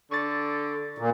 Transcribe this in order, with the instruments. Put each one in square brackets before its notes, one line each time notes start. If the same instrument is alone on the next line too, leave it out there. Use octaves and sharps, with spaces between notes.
[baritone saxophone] D3 [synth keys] C#6 A6
[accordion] A#2